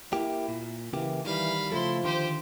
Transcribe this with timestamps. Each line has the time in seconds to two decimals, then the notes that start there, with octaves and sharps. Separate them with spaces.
0.13 A#3 E4 G4
0.48 A#2
0.93 C#3 E3 A#3 G4
1.25 D#3 E3 G3 F5 B5
1.72 C#3 F3 A3 E4 A4 C6
2.04 D3 D#3 G4 C5 C6